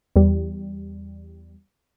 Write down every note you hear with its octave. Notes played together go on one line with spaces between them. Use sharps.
E2 G3